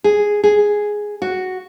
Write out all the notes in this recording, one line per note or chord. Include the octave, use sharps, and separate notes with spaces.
G#4
G#4
F#4